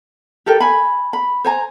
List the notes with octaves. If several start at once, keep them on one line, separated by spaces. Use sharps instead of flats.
G4 A4 A#4 G5
G#5 B5
B5
C5 G#5 A#5